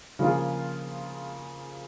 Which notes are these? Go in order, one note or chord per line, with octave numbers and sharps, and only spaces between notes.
C#3 F3 A#3 F4 G#4